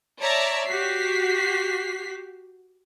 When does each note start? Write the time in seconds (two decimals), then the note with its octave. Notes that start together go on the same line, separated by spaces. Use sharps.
0.21 C#5 D5 E5 A5 A#5
0.69 F#4 G4 B6 C7